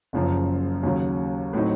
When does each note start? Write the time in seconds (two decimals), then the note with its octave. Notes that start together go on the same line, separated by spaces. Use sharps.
0.13 F#1 F#2 C#3 F3
0.83 D#2 C#3 F#3
1.53 A2 F#3 C4 D#4